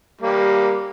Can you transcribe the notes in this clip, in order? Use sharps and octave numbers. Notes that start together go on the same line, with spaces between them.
G3 A#3